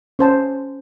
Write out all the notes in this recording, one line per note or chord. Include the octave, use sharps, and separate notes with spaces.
C#4 C5 A5